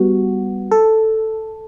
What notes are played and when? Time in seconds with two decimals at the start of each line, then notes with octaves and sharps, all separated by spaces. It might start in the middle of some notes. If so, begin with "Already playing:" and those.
Already playing: G3 B3 F#4
0.72 A4